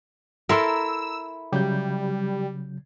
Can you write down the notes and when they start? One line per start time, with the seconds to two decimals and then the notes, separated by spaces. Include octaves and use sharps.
0.49 E4 A4 A#4 A#5 C6 E6
1.52 C#3 F#3 G3 G6